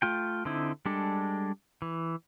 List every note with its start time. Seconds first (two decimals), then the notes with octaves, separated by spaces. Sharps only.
0.02 A3 F4 G5
0.45 D3 C4 D#4 E4
0.86 G3 G#3 D4 A4
1.82 E3